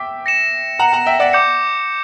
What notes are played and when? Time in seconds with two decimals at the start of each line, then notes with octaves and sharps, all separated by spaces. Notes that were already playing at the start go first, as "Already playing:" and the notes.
Already playing: E5 G5 D6
0.26 A#6 C#7 E7
0.79 F#5 A#5
0.93 F#5 A#5
1.06 E5 G5
1.20 D5 F#5
1.33 D6 G6 C#7